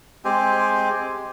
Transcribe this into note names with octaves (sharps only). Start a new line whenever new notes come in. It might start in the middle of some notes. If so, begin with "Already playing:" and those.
G#3 C4 G4 G#5